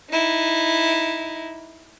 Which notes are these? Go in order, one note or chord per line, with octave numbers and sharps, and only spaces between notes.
D#4 E4